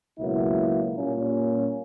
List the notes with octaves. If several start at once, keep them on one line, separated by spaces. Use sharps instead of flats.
C#2 B2 F#3 A#3 E4
A#2 G3 A#3 C#4